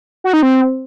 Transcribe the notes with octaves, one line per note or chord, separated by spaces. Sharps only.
F#4
D#4
C4